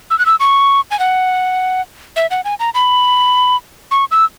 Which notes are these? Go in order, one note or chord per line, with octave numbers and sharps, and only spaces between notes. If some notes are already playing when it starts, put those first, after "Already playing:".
E6
F#6
E6
C#6
G#5
F#5
E5
F#5
G#5
A#5
B5
C#6
E6